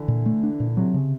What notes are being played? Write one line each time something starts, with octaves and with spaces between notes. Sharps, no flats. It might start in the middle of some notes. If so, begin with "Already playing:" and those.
Already playing: D3 E3
A#2
A3
D4
A#2
C3 F#3
C#3